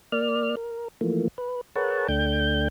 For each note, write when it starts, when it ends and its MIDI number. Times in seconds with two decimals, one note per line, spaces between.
0.12 0.55 58
0.12 0.55 74
0.12 0.55 89
0.57 0.88 70
1.01 1.28 52
1.01 1.28 53
1.01 1.28 57
1.01 1.28 58
1.38 1.61 71
1.76 2.08 68
1.76 2.08 70
1.76 2.08 71
1.76 2.08 73
1.76 2.08 78
1.76 2.08 81
2.08 2.68 38
2.08 2.68 57
2.08 2.68 62
2.08 2.68 79
2.08 2.68 91